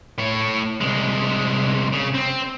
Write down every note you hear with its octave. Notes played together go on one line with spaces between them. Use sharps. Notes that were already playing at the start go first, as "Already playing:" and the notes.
A2 C#5
C2 G#3
C#3
C4